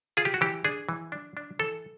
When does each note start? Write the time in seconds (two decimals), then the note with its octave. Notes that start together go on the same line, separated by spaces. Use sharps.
0.17 F4 G#4
0.25 G4
0.34 F#4
0.41 E3 G4
0.65 D4 G#4
0.89 E3
1.12 D4
1.37 D4
1.59 E3 A4